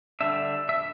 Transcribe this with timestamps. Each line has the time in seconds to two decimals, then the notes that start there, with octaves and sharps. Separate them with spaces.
0.21 D3 G3 D4 E5
0.69 E5